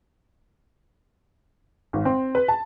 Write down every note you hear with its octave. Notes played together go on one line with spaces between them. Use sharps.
G#1
C4
B4
A5